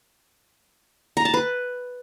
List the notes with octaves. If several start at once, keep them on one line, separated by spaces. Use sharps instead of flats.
A#5
A5
B4